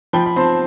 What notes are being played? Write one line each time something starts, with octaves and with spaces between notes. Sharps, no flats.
F3 G5 B5
B5
C4 A5 C6